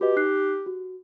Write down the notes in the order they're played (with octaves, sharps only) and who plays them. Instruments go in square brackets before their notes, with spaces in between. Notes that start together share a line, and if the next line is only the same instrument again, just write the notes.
[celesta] F#4 B4 D#5 [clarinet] G4
[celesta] D#4 F#6 C7
F#4